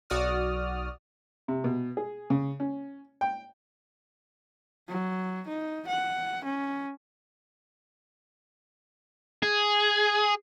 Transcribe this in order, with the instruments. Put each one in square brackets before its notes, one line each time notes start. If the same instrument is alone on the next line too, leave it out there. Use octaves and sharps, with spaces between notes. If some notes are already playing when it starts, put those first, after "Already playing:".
[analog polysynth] B1 F#4 D5 D#6 F6
[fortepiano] C3
B2
G#4
C#3
C#4
G5
[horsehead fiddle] F#3
D#4
F#5
C#4
[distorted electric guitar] G#4